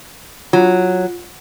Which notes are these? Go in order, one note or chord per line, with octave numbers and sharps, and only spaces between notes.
F#3 F4